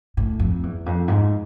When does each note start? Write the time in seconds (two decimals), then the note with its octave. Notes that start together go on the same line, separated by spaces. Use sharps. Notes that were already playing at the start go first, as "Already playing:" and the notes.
0.17 A2
0.40 F2
0.63 E2
0.86 F2
1.08 G#2